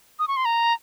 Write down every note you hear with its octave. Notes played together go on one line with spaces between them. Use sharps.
D#6
C#6
C6
A#5